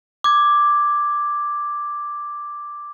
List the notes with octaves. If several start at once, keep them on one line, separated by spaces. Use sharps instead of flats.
D6 G#6